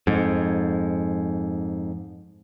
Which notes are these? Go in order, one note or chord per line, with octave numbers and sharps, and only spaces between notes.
F2 G#2